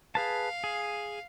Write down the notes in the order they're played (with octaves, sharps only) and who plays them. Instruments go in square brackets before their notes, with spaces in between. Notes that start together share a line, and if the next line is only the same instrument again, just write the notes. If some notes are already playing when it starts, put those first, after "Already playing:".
[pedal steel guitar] G#4 B4 A5 [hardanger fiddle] F5
[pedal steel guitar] G#4